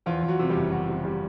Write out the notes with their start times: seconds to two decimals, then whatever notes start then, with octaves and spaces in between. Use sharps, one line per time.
0.06 E2 F3 F4
0.23 E2
0.28 F#3 F#4
0.39 C3
0.50 G3 G4
0.56 F#1
0.72 F#1 F#3 F#4
0.89 C3
1.05 C3 G3 G4